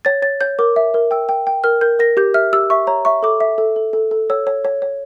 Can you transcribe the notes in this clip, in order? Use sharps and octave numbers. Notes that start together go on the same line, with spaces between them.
C#5 A6
C#5 A6
C#5 G6
A#4 D6
E5
A#4
G5 E6
G5
G5
A#4 F6
A#4 G6
A#4 A#6
G4 G6
E5 F6
G4 E6
E5 C#6
C#5 A#5
E5 C#6
A4 D6
E5
A4
A4
A4
A4
C#5 E6
C#5
C#5
C#5